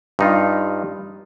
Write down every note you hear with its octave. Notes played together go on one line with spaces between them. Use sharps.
G2 D#4 F4